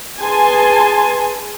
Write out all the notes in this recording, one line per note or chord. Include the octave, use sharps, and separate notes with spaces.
G#4 B4 G#5 A5 C6